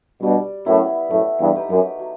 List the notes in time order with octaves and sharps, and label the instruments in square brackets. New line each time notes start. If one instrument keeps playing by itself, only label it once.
[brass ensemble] G2 B2 [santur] G3
[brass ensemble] F#2 A2 [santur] B3 E4
[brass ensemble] F#2 A2 [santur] A3
[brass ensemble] E2 G2
[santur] D#4 G4 B4
[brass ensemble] F#2
[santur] F#3